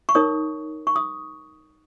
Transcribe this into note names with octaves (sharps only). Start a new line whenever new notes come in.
C#6
D#4 A#4 C#5 D#6
C#6
D#6